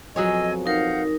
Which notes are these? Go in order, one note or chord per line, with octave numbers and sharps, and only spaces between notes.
F2 B2 F#3 G#4 C#5 D#5 G#5 E6
D#4 A#4 F5 F#5 G6